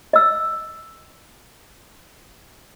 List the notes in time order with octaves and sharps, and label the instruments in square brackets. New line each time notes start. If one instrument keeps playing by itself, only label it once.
[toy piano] D#5 E6